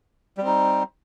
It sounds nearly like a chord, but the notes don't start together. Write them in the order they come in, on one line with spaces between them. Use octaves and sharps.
G3 C4 D#4